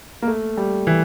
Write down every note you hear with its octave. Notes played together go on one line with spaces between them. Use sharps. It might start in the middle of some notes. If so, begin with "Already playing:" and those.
A#3
A3
G3
E3